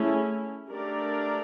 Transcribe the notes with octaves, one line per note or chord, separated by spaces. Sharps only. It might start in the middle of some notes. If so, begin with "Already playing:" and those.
Already playing: A3 C#4 E4 G#4
A3 D4 G4 A#4 D5